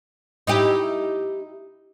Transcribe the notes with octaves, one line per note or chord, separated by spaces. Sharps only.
D#4 E4 G4